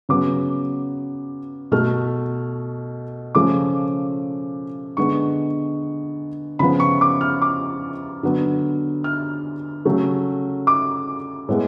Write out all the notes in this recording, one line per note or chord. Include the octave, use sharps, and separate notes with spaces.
C#3 F#3 B3 D6
B2 A3 F6
C#3 F3 A3 D6
D3 G#3 B3 C#6
C#3 F3 B3 B5
C#6
D6
F6
D6
D3 F#3 B3
F6
C#3 F#3 A3
D6
A2 G#3 B3